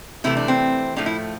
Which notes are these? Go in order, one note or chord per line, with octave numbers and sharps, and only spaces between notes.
C3 E3 A3 E4
D4
C4
A2 F3 A3 D4
E4